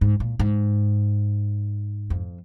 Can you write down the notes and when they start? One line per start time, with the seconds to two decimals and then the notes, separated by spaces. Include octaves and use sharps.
0.01 G#2
0.20 A#2
0.39 G#2
2.10 F2